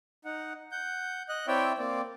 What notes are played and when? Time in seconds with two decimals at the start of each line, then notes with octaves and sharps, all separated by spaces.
0.25 D#4 F#5
0.72 F#5 G6
1.29 D#5 F#6
1.48 C4 E4 C#5 D5 E5 G5
1.78 A#3 C4 D5